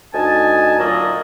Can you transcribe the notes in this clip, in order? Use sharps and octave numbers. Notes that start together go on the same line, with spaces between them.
D2 D#4 G#5 A5
F#2 A#2 F#3 A#3 D#5 A#5